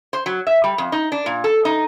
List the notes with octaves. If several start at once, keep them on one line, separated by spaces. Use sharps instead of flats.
C5
F#3
E5
G3
F2
D#4
D4
A#2
A4
D#4